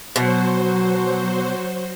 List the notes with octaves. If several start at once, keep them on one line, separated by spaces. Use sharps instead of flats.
B2 F#3 F#4 C5